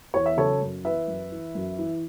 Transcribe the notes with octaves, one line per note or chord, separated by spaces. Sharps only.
E2 C#5
E5
C#3 F#3 A4 C#5
F#2
E3 B4 E5
F#2
E3
F#2
E3